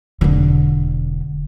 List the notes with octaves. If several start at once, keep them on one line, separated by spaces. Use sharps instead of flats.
E1 D3